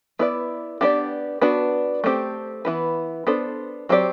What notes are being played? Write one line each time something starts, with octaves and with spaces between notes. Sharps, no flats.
B3 E4 B4 D5
B3 D4 G4 B4 D5
B3 D4 F#4 B4
A3 C4 G4
E3 B3 E4 B4
B3 D4 A4 C5
F#3 C4 G4 D5